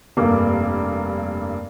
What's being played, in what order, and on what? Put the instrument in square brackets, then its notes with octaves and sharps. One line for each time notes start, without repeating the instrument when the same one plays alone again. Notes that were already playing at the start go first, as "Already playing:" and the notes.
[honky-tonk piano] F1 G2 A#3 D6